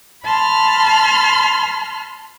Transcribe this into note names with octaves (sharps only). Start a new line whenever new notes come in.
A5 B5 C6 F6